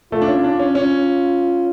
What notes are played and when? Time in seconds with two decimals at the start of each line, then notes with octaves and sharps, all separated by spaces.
0.12 A3 F4
0.22 D4
0.28 C#4
0.44 D4
0.59 C#4
0.75 C#4 F4